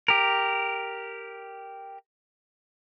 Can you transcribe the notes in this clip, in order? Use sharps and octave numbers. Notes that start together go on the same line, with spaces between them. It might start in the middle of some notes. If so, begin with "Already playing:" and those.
G4 A#4